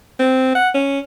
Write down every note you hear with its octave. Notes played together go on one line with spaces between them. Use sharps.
C4
F#5
C#4